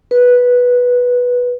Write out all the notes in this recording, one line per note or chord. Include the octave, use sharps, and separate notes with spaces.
B4